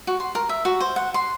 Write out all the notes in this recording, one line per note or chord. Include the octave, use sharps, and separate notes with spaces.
F#4
C6
A#4
E5
F#4
C5
F#5
C6